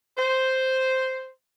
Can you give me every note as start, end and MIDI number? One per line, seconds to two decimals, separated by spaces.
0.18 1.29 72